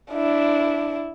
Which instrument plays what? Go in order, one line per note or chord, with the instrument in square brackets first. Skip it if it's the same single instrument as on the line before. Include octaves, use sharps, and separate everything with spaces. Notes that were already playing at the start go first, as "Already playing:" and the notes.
[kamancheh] D4 E4